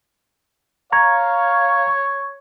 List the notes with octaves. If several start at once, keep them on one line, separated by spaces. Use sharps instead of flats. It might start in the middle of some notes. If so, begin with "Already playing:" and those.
C#5 F5 A#5 C#6 G#6